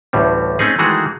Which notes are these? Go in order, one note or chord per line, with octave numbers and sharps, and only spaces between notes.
A1 D2 A2 G3
A3 C4 C#4 D#4 G#4
D#3 E3 G#3 A3 F#4 G#4